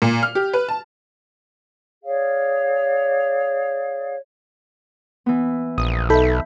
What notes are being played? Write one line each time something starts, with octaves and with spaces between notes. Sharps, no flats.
A#2
F6
G4
B4
A5
G#4 C#5 D5 F5
E3 B3
A#1 D#6
B1 D#4 A4 E5 B5 G6